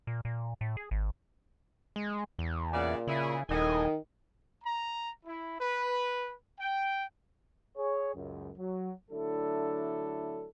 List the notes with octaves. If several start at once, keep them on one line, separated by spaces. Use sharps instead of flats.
A#2
A#2
A2
G#4
G#1
G#3
E2
A#2 C#3 D5 F#5
C#3 E4 G#4
D#1 A2 D#3 D#5 G#5
A#5
E4
B4
G5
G#4 C#5
C#2 F#2
F#3
D3 F#3 A3 D4 E4 A4